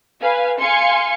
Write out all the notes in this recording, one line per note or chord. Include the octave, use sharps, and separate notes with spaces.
B4 F5 G#5
F5 G#5 C6 C#7